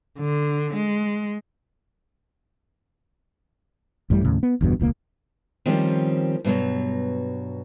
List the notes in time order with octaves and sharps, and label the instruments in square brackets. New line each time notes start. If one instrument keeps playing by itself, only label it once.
[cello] D3
G#3
[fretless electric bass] A1 F#2 A2 G3
D#2 A2 C#3
B3
G1 E2 G2 B2
E1 C#2 D3 A#3
[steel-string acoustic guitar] D#3 F3 G3 C4 C#4
G2 B2 F3 F#3